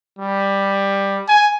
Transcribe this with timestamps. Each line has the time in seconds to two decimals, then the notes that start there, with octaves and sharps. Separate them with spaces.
0.19 G3
1.28 G#5